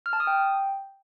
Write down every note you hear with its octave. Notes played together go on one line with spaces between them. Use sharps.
F6
A5
D#6
G5